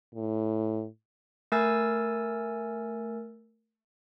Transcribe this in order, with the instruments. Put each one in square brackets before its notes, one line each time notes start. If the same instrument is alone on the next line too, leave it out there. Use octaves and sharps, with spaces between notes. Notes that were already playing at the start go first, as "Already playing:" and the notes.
[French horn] A2
[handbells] A3 A#4 G#5 E6 A6